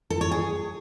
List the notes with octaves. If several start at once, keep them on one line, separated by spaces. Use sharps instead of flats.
A4
C#5
G#4